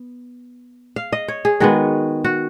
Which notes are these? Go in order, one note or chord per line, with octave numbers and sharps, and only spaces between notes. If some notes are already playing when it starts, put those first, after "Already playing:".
Already playing: B3
F5
D#5
C#5
G#4
D#3 G#3 B3 F#4
F#4